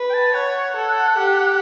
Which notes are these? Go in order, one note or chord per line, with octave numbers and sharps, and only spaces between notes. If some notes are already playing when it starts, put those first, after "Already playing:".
Already playing: B4
G5
A5
C#5 F#5
A4
G4